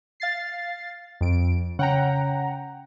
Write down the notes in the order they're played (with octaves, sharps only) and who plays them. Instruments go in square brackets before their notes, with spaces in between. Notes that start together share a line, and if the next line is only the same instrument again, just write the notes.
[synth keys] F5 A6 C7
F2 D7
[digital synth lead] C#3 [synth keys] F#5 G5 A#5